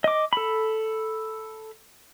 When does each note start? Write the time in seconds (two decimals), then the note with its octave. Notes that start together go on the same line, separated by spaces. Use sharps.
0.04 D#5 D6
0.33 A4 B5